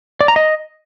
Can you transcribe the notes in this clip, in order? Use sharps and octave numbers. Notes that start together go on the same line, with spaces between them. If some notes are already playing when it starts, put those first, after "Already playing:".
D5
A#5
D#5